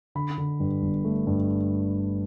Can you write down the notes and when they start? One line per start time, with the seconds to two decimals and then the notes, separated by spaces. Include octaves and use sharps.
0.15 D3 B5
0.38 D3
0.60 G2
0.82 G1
1.04 A3
1.27 G2